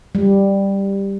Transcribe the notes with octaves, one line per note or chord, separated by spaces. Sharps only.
G3